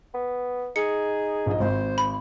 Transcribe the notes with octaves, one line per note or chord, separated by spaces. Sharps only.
B3
D#4 G#4 C#7
A#1 D#5
G#1 C5
B5